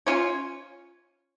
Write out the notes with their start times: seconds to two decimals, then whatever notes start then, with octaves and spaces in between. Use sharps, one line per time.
0.07 C#4 F4 C#5